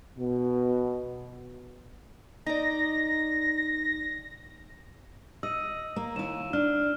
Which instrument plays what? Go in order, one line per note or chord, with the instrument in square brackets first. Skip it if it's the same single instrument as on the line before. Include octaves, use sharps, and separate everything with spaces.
[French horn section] B2
[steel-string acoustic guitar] D#4 D5 [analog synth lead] A#6
[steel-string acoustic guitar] D#5 [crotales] E6 D#7
[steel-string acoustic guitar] A#3
[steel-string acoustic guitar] D#2 E4 [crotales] E7
[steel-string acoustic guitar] D4 [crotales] F6